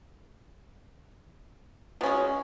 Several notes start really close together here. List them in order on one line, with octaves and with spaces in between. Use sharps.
B2 C#4 G#3